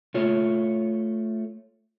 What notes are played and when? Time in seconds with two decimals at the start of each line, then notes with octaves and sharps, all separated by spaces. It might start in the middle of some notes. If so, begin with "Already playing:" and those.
0.14 A3 F4 C#5